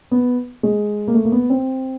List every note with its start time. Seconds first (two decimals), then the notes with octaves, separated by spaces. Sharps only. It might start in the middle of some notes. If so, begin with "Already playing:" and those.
0.11 B3
0.63 G#3
1.08 A#3
1.14 A3
1.25 A#3
1.32 B3
1.50 C4